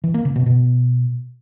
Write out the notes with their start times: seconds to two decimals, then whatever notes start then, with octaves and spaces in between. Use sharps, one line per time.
0.04 E3
0.14 A#3
0.25 C#3
0.36 B2
0.46 B2